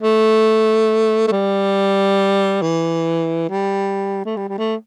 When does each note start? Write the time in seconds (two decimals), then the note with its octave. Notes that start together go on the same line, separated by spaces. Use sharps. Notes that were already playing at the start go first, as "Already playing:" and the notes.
0.02 A3
1.28 A3
1.32 G3
2.62 E3
3.49 G3
4.25 A3
4.36 G3
4.49 G3
4.58 A3